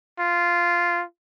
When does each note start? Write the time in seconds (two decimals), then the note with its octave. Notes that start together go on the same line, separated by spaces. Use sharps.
0.19 F4